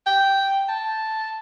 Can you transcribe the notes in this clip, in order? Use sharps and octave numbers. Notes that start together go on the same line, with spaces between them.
G5
A5